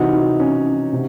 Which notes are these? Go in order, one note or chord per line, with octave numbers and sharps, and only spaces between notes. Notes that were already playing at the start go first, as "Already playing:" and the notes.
Already playing: C3 E3 D#4 F#4
C#4
C3